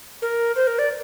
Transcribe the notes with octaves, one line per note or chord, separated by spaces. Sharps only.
A#4
C5
A#4
D5